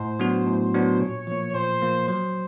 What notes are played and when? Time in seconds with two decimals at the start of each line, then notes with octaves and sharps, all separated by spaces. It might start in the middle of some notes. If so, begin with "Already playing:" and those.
Already playing: A2 C5
0.19 F#3 B3 D4 F#4
0.47 A2
0.74 F#3 B3 D4 F#4
1.00 A#2 C#5
1.27 F3 A#3
1.54 A#2 C5
1.82 F3 A#3
2.08 F#3 C5